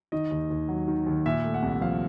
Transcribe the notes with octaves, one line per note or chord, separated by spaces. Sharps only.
D#3 D#5
D#2
D#2
F#3
D#3
D#2
A#2 E5
A3
F#5
C2
F3 F5